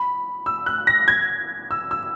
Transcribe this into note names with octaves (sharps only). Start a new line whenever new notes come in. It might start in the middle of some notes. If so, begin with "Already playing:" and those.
Already playing: B5
E6
F#6
A#6
G#6
E6
E6